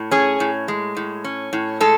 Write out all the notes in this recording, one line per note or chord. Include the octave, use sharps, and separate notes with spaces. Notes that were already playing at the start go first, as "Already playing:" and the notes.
Already playing: A2
C#4 G#4
A2
G#3
A2
C#4
A2
G#3 A4